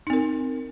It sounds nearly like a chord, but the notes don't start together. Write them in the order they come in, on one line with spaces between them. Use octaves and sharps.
D#4 C4 A#4